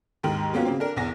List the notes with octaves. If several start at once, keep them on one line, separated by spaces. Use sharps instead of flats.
D#2 G#2 D#3
F#3 A#3 B3 C#4 F4 F#4
C#3 A#3 C4
D4 A#4
B1 E2 A#6